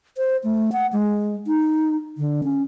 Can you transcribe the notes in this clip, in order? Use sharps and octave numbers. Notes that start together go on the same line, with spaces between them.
C5
A3
F#5
G#3
D#4
D3
C#4